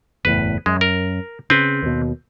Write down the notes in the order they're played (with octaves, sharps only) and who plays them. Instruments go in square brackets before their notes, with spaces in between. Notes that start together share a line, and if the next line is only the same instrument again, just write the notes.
[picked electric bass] F#1 E2 A2 [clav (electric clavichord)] B4
[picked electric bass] F#2 [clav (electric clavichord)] G#3
[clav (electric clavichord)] A#4
[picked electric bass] C#3 [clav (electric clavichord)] C4 B4
[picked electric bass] D#2 B2